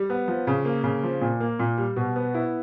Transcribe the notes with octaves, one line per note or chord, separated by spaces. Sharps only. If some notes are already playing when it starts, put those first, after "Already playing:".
Already playing: G3
B3
F3
C#3
A#3
C#3
F3
A#2
A#3
A#2
G3
B2
B3
E4